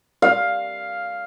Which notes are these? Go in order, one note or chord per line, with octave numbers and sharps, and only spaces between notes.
F5